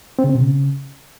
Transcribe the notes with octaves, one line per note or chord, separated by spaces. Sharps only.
C4
C#3
C4
B2
C#3